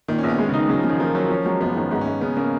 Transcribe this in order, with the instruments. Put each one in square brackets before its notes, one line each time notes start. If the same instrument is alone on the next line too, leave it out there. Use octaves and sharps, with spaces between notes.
[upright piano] A#2 [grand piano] D#3
[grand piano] C#4
[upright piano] A#1
[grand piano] B3
[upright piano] G#3
[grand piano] C#3
[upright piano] D#4
[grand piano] D#3
[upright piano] C#3 [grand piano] F#3
[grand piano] F3
[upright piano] C#3
[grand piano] D#3
[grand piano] F3 [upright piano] A#3
[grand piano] F#3 [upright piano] C#4
[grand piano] F3 [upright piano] C#4
[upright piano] F#3 [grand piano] G#3
[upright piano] F#1 [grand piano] B3
[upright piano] D#3 [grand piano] C#4
[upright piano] G#2 [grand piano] B3
[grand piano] C#4
[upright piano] G#2
[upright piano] C#3 [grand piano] B3
[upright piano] C#3 [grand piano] A#3